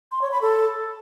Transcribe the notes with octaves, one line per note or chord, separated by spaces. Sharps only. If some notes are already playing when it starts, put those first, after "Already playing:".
C6
C#5
B5
A4